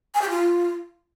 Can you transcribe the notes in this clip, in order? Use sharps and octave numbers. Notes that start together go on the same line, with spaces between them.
G#5
G4
F4